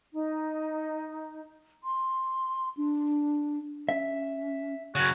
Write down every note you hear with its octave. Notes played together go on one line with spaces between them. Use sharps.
D#4
C6
D4
C#4 E5
F#2 C#3 F#4